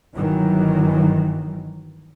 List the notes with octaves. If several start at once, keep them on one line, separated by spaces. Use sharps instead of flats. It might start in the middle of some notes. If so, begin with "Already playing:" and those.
G1 D#3 E3 F#3